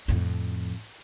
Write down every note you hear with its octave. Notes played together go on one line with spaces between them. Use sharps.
F2 A2